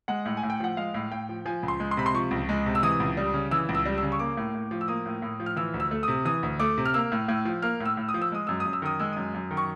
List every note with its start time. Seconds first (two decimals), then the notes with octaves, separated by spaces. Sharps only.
0.08 G#3 F#5
0.26 A2
0.37 G#5
0.43 A2
0.50 G5
0.60 F3 F#5
0.77 G#3 F5
0.94 A2
1.12 A2 G5
1.29 F3
1.46 F3 G#5
1.63 C#2
1.68 C6
1.80 G#3
1.91 C6
1.97 C3 B5
2.06 C6
2.14 F3 C#6
2.31 C#2
2.49 G#3
2.66 C3
2.75 E6
2.83 E3 D#6
3.00 C#2
3.17 G3
3.34 C#3
3.51 E3 E6
3.69 C#2
3.75 E6
3.85 G3
3.98 E6
4.03 C#3
4.12 C#6
4.19 A#3 D6
4.37 A2
4.55 A2
4.71 F3
4.81 E6
4.88 A#3 D#6
5.06 A2
5.22 A2
5.40 F3
5.46 F6
5.56 E3 E6
5.74 D2
5.80 E6
5.91 A3
6.03 C3 D#6
6.25 E3 D#6
6.43 D2
6.60 A3 D6
6.78 C3
6.85 F6
6.94 A#3 E6
7.12 A2
7.28 A2
7.45 F3
7.62 A#3 F6
7.80 A2
7.85 E6
7.97 A2
8.09 D#6
8.14 F3
8.22 E6
8.32 G#3 D#6
8.47 F#2 E6
8.60 D#6
8.66 F#2
8.73 E6
8.82 D#3 D#6
9.00 G#3 E6
9.13 F#2 D#6
9.34 F#2
9.51 D#3
9.57 C#6